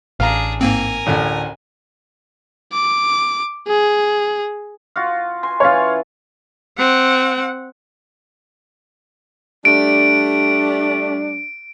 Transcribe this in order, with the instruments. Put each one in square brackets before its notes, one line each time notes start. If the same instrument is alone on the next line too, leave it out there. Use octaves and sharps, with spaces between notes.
[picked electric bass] A1 [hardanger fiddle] D4 G#4 [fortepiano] F5 A#5
[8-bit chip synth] G#2 A#3 C4 [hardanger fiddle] A#4 G#5
[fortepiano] A1 D2 A2
[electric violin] D6
G#4
[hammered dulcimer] F4 F#4 F5
G#5 C6
[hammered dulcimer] E3 C#4 F4 [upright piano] C#5 F5
[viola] C4 F#5
[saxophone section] G3 A3 D4 [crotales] D7